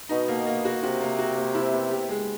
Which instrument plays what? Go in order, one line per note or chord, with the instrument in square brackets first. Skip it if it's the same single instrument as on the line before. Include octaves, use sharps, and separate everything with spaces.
[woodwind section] B2 [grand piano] D#4
[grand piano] A#3
A#3
F#4
[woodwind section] C3 [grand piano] F#4
[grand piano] A#3
F#4
A#3
E4
B3
G4
G#3